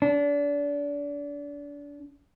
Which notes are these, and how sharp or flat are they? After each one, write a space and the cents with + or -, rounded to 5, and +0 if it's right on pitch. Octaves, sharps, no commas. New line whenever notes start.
D4 -30